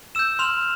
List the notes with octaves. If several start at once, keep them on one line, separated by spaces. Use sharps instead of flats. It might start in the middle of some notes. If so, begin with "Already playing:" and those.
E6 G6 E7
C6 F6 F7